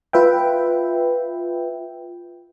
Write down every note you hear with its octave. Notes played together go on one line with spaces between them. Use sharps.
F4 B4 E5 G5